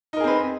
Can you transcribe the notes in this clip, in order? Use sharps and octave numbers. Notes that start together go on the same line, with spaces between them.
C4 D#4 G#4 A#4 B4